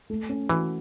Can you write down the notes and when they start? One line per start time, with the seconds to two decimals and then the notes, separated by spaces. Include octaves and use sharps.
0.10 A3
0.29 C#4
0.49 E3 F#4